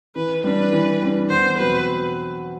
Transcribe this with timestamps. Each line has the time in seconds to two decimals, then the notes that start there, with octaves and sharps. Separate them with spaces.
0.16 E3 B4
0.44 G3 D4 B4
0.73 E3
1.02 G3 D4
1.30 E2 C5
1.59 B2 F#3 C4 F#4 B4